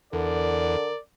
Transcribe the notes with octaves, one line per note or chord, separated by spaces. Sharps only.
E2 D3 A#4 D5